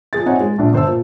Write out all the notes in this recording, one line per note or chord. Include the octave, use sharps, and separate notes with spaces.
F3 G#4 A6
C4 D#4 C#5 E5 F#5 G#5
G#3
A#1 D4
G1 C5 A5 E6
A#2